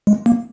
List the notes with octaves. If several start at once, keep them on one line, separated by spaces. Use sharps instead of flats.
G#3
A#3